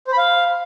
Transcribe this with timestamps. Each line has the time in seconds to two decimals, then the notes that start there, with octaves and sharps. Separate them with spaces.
0.07 C5
0.12 B5
0.18 F5